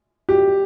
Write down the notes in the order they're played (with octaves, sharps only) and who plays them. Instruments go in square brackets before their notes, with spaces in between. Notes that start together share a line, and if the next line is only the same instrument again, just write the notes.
[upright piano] G4